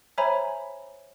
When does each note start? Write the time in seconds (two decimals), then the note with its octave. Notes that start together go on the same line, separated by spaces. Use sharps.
0.18 C5 C#5 E5 G#5 A#5 B5